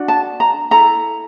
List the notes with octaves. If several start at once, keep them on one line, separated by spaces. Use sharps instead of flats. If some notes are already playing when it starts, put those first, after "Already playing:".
Already playing: D4 F#4
A5
A#5
E4 A4 A#5